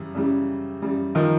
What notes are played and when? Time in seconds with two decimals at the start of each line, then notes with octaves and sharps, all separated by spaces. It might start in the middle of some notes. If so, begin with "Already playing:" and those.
Already playing: F#2 C#3 E3 G3
0.15 F#2 C#3 E3 G3
0.82 F#2 C#3 E3 G3
1.15 D#3 F3